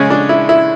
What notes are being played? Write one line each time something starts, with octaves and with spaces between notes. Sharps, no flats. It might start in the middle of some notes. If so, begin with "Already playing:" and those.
Already playing: C#3 G#3 C#4
D4
E4
E4